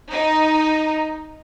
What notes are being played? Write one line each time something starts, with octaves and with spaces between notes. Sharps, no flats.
D#4